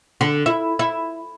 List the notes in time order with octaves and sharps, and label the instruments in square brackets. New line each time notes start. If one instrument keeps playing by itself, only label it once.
[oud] D3
E4
E4